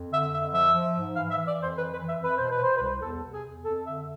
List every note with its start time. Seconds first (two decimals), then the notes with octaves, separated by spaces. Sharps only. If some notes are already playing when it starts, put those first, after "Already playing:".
Already playing: F2
0.10 D3 E5
0.31 F2 E5
0.51 F3 E5
0.72 F3
0.93 G#2
1.14 E3 F5
1.30 E5
1.35 E3
1.45 D5
1.56 F2
1.61 C5
1.76 E3 B4
1.91 B4
1.98 E3
2.07 E5
2.17 F2
2.23 B4
2.37 B2 C5
2.49 B4
2.60 B2 C5
2.76 B4
2.80 C2
3.01 E2 A4
3.22 C3
3.32 G#4
3.44 E2
3.63 F2 A4
3.84 D3 E5